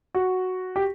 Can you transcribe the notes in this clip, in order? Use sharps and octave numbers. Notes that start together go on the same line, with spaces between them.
F#4
G4